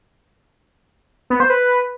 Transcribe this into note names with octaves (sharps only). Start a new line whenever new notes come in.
B3
C5
B4